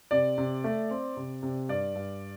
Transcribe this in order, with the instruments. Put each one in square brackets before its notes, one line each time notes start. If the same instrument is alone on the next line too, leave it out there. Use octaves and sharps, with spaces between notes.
[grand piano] C3 D5
C3
A3
C4
C3
C3
G2 D5
G2